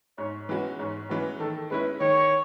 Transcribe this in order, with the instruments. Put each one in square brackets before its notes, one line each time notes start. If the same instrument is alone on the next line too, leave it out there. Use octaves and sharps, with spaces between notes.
[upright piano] G#2 [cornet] C#5
[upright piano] E3 G#3 C#4 F#4 [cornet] B4
[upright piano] G#2 [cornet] C#5
[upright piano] E3 G#3 C#4 F#4 [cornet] B4
[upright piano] D#3 [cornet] A4
[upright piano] G#3 C#4 E4 [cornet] B4
[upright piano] D#3 [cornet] C#5